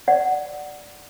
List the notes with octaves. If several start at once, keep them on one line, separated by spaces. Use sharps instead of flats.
D5 F#5